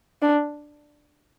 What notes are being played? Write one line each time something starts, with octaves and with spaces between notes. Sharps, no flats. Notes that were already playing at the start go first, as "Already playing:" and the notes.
D4